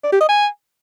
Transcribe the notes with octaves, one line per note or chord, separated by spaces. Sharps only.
D5
G4
D#5
G#5